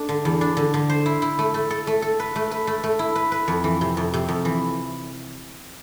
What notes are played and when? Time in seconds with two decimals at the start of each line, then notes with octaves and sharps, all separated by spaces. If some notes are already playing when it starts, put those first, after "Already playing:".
Already playing: A3 D4
0.09 D3
0.25 E2
0.41 D4
0.57 D3
0.74 D3
0.89 C5
1.06 E4
1.22 E4
1.39 A3
1.54 A3
1.71 A4
1.87 A3
2.02 A4
2.20 B4
2.36 A3
2.51 B4
2.67 A3
2.84 A3
2.99 E4
3.16 B4
3.32 B4
3.48 F2
3.64 E3
3.81 C3
3.97 F2
4.14 C3
4.29 F2
4.45 E3